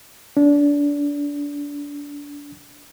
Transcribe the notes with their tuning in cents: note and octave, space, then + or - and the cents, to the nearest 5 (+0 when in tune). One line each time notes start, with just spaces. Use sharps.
D4 -25